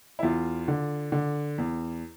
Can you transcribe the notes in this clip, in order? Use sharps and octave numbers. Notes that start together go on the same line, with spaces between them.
E4
E2 F4
D3
D3
E2